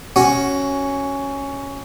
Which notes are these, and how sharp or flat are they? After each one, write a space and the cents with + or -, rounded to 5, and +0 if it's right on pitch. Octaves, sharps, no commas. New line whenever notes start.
C#4 +0 F#4 +15